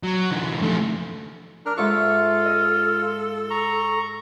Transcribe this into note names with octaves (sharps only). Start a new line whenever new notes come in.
F#3
D3 E3
F3 A3
D4 A#4 F6
G#2 F4 A4 E5 C#6
D#5
A#5 C#6